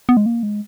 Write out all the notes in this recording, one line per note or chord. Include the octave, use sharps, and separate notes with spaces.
B3
G#3
A#3
G#3